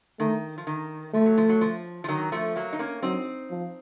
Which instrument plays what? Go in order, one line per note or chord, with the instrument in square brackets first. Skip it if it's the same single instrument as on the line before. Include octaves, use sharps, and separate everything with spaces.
[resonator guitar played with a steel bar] D#3 [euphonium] A3
[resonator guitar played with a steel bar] F3
D#3
[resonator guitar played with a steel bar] F3 [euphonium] A3
[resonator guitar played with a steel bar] F#3
F3
F#3
F3
F3
D#3 F#3
F3 A3
F#3 A#3
D#4
A#3 C#4
[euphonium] F#3 [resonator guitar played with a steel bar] C4 D#4
[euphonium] F3